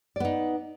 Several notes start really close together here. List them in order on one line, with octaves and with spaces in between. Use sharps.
D5 B3 D#4